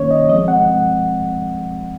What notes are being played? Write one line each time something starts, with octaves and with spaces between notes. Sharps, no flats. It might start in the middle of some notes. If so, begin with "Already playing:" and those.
Already playing: D#3 A#3 C#4 C#5
D#5
F3 G#3 C4 D#5
F#5